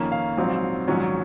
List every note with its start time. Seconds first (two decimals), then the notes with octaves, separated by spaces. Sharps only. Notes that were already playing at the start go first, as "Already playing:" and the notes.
Already playing: F2 D#3 A#3 C#4
0.12 F5
0.38 A#1 G#2 F#3 C4
0.88 A#1 G#2 D#3 F#3 C#4